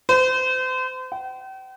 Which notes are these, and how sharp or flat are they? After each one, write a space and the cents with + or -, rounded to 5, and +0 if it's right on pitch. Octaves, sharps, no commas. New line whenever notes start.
C5 -35
G5 -40